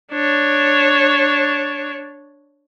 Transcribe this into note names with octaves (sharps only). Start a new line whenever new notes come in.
D4 C#5